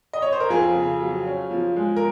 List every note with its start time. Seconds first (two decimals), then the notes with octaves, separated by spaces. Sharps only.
0.13 D#5
0.22 C#5
0.32 C5
0.40 A#4
0.50 F2 F4 G#4
0.75 C#3
1.00 F#3
1.26 C#4
1.51 F3
1.76 G#3
1.96 A#4